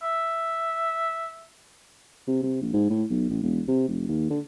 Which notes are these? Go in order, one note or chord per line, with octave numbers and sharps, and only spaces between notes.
E5
C3
C3
A#1
G#2
A2
B1
A1
E1
C3
F1
D#2
D3